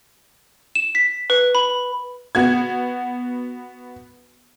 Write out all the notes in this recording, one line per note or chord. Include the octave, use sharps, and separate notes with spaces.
E7
B6
B4
B5
B3 F#4 G#6